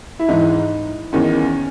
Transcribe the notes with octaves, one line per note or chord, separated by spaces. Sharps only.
E4
G#2 E3 D#4
E2 D#3 C#4